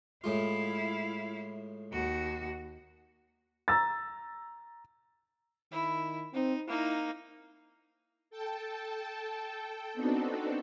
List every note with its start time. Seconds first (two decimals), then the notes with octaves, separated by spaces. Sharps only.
0.24 A2 G#3 E4 F4 F5
1.92 D#2 F#4
3.68 A#5 E6 A6
5.72 D#3 E4
6.34 C4 D#4
6.68 A#3 D#4 E4
8.30 A4 G5 A5
9.94 B3 C4 D4 D#4 F#4 A4